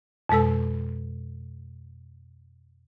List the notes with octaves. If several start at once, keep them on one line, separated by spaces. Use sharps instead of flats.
F2 B2 G#3 A4 E6